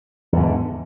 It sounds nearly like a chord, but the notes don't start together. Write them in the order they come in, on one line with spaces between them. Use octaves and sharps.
E2 G#2 D3